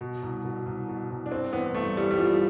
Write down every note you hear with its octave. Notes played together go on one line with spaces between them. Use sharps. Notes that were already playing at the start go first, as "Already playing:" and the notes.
B2
C2
B2
C2
B2
C2
D4
G2 C4
A1 B3
G2 A3
A1 G3
G3
E3 F3